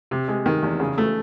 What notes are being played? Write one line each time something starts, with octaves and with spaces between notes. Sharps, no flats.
C3
G#3
D#3
E2
C#3
A3